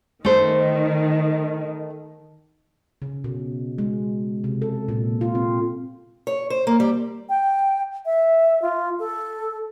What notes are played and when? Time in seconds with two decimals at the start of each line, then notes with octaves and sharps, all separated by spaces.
0.25 D#3 A3 C5
3.02 C#3
3.24 B2
3.78 G#3
4.44 C3
4.62 A4
4.88 A#2
5.21 F4
5.35 C4
6.27 C#5
6.50 C5
6.67 A#3
6.80 G3
7.29 G5
8.06 E5
8.62 F4
8.99 A4